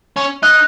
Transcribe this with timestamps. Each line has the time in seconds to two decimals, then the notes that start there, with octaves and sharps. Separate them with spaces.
0.16 C#4
0.43 D#4 F#6